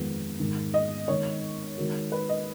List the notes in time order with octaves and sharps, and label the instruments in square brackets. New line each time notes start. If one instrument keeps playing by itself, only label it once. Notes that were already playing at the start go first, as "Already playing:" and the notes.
Already playing: [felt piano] F2 D#3 G#3 B3
G#2 D#3 G#3
[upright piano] D#5
[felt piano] D#3 G#3 D#4 A#4 [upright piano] C#5
[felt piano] D#3 G#3 D#4 F#4 A#4
[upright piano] B4
D#5